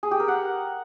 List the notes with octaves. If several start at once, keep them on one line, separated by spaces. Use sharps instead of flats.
G#4
G4
A#4
F#5